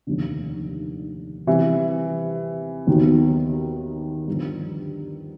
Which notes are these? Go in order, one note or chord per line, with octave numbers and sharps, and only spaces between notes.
F1 D#2 D3
C3 E3 G3
D#2 D#3 F#3 B3
G2 D3 F3